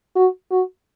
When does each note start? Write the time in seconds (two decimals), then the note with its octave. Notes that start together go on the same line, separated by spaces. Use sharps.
0.16 F#4
0.50 F#4